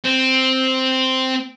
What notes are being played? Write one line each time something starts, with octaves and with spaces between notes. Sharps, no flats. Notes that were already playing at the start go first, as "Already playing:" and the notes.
C4